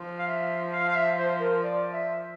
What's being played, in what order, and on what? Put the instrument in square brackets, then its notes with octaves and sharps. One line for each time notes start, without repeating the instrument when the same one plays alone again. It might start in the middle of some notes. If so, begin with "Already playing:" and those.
Already playing: [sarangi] F3
[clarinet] F5
E5
F5
F5
E5
C5
A#4
D5
E5